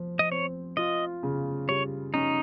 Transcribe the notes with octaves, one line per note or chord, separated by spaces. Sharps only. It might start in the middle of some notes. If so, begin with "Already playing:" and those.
Already playing: F3
D#5
C4 C#5
F4 D#5
C#3
G3 C#5
C#4 D#4